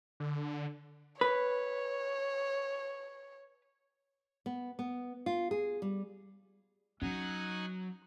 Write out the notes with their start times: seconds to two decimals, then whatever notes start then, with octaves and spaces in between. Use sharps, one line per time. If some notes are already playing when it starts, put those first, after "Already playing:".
0.20 D3
1.21 B4 C#5
4.46 B3
4.79 B3
5.26 F4
5.51 G#4
5.82 G3
7.01 F#3 C#4 D#4 F#5 G#5